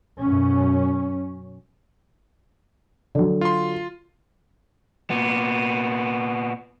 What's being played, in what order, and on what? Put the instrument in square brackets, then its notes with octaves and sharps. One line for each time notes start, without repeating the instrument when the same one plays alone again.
[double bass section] F#2 B2 C#4
[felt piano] D3 F#3
[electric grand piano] F4 C6
[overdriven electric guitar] A#2 B3